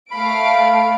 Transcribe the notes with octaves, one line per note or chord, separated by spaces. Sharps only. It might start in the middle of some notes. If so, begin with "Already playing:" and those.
A3 F5 B5 D7